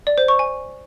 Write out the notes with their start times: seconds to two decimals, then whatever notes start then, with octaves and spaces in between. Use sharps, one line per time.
0.07 D5
0.18 C5
0.28 C#6
0.39 G#5